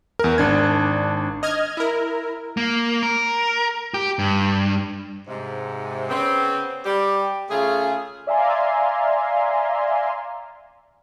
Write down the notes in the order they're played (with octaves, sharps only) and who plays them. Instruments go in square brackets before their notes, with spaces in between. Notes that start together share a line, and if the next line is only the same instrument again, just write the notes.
[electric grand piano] E2 A#4
G#1 D4 G#6
[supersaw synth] D#5 F6 G#6
E4 A#4
[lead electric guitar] A#3
A#4
G4
G2
[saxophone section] G#2 C3
C#3 B3 C4
G3 G4
C#3 A3 F4 G#4
[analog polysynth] D5 E5 F5 G#5 A#5 C6